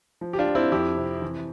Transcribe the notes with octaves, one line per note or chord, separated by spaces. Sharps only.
F3
G4
D4 F4
F3
C4 E4
F2 E4 G4
C3
E3